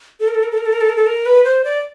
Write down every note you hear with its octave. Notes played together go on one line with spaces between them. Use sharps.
A4
A#4
A4
A#4
A4
A#4
A4
A#4
A4
A#4
A4
A#4
B4
C5
D5